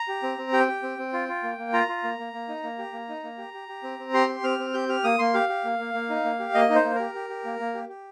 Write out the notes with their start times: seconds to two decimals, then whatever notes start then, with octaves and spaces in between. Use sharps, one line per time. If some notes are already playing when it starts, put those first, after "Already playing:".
Already playing: A#5
0.08 G4
0.23 C4
0.38 C4
0.53 G4 G5
0.68 G4
0.83 C4
0.98 C4
1.13 F4
1.29 F4
1.43 A#3
1.58 A#3
1.73 F4 A#5
1.88 F4
2.04 A#3
2.19 A#3
2.33 A#3
2.49 D#4
2.64 A#3
2.79 G4
2.93 A#3
3.09 D#4
3.24 A#3
3.38 G4
3.54 G4
3.68 G4
3.83 C4
3.99 C4
4.14 G4 C6
4.29 G4
4.44 C4 F6
4.59 C4
4.74 G4 G6
4.89 G4 F6
5.04 A#3 D#6
5.19 A#3 C6
5.34 G4 F5
5.49 G4
5.64 A#3
5.79 A#3
5.94 A#3
6.10 D#4
6.24 A#3
6.40 G4
6.54 A#3 D#5
6.69 D#4
6.75 C5
6.85 A#3
6.95 G4 A#4
7.15 G4
7.30 G4
7.45 A#3
7.59 A#3
7.75 G4
7.89 G4